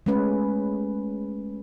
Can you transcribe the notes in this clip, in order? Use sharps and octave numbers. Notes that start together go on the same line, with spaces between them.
G#3 A3 C#4 B4